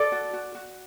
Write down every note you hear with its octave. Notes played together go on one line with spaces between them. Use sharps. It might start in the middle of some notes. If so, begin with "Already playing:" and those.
Already playing: A4 D5
F#4
F#4
F#4